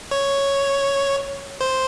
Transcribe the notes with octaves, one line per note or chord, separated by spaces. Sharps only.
C#5
C5